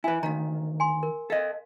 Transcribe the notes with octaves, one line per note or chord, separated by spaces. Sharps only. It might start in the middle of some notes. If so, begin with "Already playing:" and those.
E4 B4 E5 G#5
D2 D#3 F5 A#5
G#5 C6
A#4
A4 D#5 F5